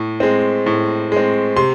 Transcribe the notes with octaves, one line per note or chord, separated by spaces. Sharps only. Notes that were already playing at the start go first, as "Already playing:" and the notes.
Already playing: A2
G#3 C4
A2
G#3 C4
C3 C6